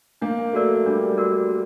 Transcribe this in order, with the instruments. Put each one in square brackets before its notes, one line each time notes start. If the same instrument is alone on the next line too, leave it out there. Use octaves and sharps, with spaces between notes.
[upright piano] A#3 [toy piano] D4
[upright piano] A3 [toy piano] F#4 A#4 D5
[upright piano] G3 [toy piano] D4
[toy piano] F#4 A#4 D5